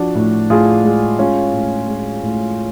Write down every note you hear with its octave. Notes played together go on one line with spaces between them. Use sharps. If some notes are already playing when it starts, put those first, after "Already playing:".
Already playing: F3 D4 F#4
A2
A2 F4 G#4
G#3
G#3 C#4 F4
A2
G#3
A2